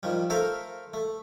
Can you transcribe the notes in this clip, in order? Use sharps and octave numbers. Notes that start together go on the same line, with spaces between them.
D#3 F3 G3
A3 A4 A#4 C5 E5 F5
A3